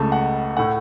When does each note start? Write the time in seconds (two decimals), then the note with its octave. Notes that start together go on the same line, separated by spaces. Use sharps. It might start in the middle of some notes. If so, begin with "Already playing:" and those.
Already playing: C#2 C#3 A3 A5
0.12 F#5
0.57 A2 A3 F#5